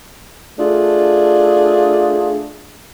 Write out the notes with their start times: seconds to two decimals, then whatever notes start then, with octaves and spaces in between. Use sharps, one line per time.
0.59 A3 D4 F4 G#4